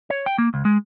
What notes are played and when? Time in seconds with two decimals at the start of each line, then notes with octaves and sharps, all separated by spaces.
0.10 C#5
0.26 G5
0.38 A#3
0.54 C#2
0.65 G#3